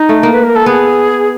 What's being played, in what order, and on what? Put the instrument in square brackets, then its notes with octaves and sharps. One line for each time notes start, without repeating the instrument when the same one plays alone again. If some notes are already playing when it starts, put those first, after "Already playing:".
Already playing: [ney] D#4
[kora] A3
A#3
[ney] B4
A#4
A4
[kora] B3 [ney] G#4